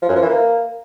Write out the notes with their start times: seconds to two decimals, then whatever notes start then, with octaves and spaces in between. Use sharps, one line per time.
0.02 F3
0.09 F#2
0.16 F3
0.22 E3
0.29 A#3